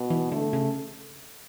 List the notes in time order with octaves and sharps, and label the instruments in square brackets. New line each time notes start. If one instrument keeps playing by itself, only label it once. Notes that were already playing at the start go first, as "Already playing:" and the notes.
Already playing: [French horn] B2
[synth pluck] E3
[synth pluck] D3 [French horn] A3
[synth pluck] C#3